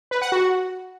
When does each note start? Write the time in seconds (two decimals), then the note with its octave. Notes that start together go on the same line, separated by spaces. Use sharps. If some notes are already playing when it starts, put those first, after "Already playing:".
0.11 B4
0.22 F#5
0.32 F#4